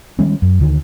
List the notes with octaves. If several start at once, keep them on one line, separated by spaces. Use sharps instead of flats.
D#3 G3 G#3 C#4
F#2
D2 D3 D#3